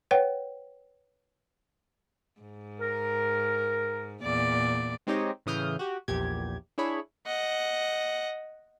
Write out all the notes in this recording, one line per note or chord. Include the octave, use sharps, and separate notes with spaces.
B4 C#5 F#5 G5
G#2
A#4
E2 A#2 D5
G#3 C4 D#4 G4 C#5 D#5
A2 C#3 E3 D#6 F6 G6
F#4 G4
A#1 E2 A#2 G4 G#6
D4 E4 G#4 C#5 B5
D#5 F#5